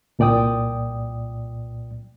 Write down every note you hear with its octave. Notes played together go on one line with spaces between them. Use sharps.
C2 A#2 D5 G5 D#6